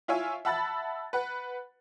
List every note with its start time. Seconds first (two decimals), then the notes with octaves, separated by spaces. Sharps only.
0.08 E4 F4 C#5 E5 G#5
0.45 E5 F#5 A5 B5 E6 A6
1.13 B4 F#5